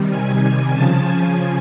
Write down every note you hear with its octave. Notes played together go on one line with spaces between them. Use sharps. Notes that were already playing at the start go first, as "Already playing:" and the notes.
Already playing: C3 D#3 G3
G#5
C#3 F3 A5
G#5